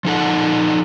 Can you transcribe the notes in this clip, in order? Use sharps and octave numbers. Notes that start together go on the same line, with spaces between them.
F3 D#4 A4 F#5